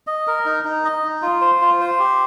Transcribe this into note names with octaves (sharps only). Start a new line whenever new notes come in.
D#5
A#4
D#4
D#4
D#5
D#4
F4
C5
F4
C5
G4